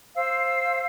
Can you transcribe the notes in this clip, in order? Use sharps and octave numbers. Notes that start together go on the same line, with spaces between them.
C5 F5 E6